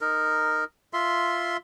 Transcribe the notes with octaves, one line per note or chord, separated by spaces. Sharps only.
D#4 A#4
F4 E5 C6